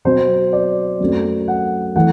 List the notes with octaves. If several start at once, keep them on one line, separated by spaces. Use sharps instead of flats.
B2 F#3 C4 C5
D5
F#2 F#3 A3 C4
F#5
E3 A3 F#5